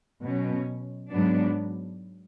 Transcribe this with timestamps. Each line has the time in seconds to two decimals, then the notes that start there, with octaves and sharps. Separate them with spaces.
0.23 B2 F#3 C#4
1.11 G#2 F#3 B3 D4